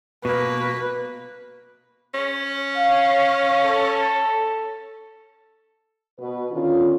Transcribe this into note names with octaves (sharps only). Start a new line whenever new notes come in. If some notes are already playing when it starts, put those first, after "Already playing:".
B2 A#3 B4
C#4
F5
A4
B2 B4
D3 D#3 C#4 F4